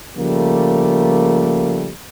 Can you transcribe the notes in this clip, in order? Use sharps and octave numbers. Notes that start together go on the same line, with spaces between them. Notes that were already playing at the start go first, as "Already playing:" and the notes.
C#3 F3 G3 A3 A#3